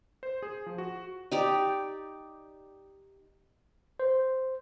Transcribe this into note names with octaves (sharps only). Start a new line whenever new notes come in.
C5
G#4
F3
F#4
D#4 G4 D5
C5